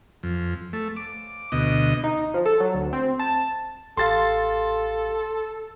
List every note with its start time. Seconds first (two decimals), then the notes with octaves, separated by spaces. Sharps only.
0.23 F2
0.73 A3
0.97 D6
1.52 D2 B2 D#5
2.04 D#4
2.34 F3
2.46 A4
2.60 F#3
2.74 D2
2.93 C4
3.19 A5
3.97 A1 G4 A4 F5 C6 A6